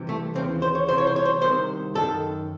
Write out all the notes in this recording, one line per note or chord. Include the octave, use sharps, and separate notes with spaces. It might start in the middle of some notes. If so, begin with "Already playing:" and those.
Already playing: C2 C3 E3
A3
D#2 C#3 E3 C4
C5
C#5
C2 C3 E3 C5
C#5
C5
C#5
C5
C2 C3 D#3 C5
F#2 D#3 A4